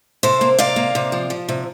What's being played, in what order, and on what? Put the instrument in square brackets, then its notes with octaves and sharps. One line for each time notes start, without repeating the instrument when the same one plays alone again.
[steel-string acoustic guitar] C3 A4 C5
A#3
C3 D5 F5
A#3
C3
F3
F3
C3